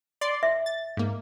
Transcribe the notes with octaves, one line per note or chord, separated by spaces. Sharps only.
D5 C6
E5
A6
G#2 A#3